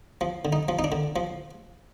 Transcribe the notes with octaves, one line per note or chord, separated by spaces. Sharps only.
F3
D3
D#4
F3
D#4
D4
D3
F3